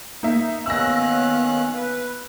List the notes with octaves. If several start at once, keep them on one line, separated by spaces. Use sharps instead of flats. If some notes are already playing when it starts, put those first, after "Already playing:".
A#3 D#4 E5
D#3 B3 C#4 F5 E6 F#6 A#6
B4